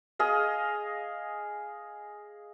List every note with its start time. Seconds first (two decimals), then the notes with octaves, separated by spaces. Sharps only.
0.19 G#4 D#5 F5